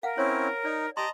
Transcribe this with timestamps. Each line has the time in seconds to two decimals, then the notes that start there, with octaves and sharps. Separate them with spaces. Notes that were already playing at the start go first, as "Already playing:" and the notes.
0.03 A#4 F5 F#5
0.18 C4 C#4 E4 C#5
0.65 D#4 D5
0.97 G4 D#5 A5 A#5 C6